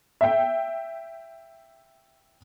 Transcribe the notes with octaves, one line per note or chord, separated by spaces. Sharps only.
E5 G5